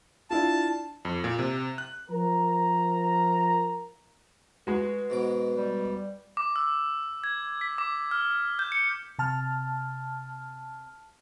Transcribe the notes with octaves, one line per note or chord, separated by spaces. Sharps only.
D4 E4 F4 A5
F2
A#2
C3
F#6
F3 A#4 A#5
G#3 F#4 B4
G#2 B2 D6
G3
D6
E6
G#6
B6
D6
F6
G6
C#7
C3 A5 F6